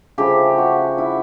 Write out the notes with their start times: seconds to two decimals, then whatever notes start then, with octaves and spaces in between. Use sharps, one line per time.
0.18 C#3 F3 A3 G4
0.58 F#4
0.98 E4